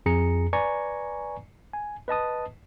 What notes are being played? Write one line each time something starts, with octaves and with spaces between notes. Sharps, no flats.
F2 G#4 A#5 C#7
B4 D5 G#5 A#5 C#6
G#5
B4 D#5 A5 D#6